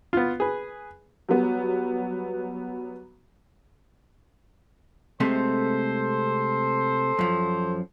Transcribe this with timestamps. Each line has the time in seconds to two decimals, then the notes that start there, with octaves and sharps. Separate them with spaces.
0.13 B3 F4
0.40 G#4 B4
1.29 F#3 G3 B3
5.20 C3 G#3 A3 A4 C5
7.19 F#2 F3